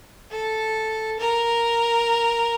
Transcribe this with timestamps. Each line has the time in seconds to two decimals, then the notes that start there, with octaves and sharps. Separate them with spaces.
0.32 A4
1.19 A#4